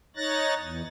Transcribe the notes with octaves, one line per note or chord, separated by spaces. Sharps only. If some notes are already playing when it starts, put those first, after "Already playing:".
D#4 C#5 F#6 A6 A#6
E2